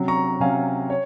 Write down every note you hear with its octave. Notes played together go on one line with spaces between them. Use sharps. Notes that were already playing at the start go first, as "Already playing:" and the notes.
Already playing: C3 F#3 C#4
A#5 C#6
C3 F#3 C#4 F5 G#5
C#5